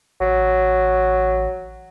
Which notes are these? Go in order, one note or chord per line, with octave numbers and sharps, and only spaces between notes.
A1 F#3